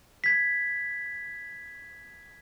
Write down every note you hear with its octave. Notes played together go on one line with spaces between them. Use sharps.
G#6 B6